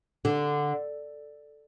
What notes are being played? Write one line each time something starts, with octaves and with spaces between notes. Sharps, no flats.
D3